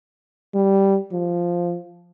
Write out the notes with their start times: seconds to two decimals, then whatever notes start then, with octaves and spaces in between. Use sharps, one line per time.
0.54 G3
1.13 F3